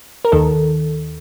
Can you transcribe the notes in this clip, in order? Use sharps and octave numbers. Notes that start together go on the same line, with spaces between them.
A#4
D#2 D#3 A4